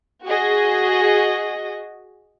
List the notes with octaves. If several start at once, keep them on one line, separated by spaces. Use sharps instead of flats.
F#4 G#4 D#5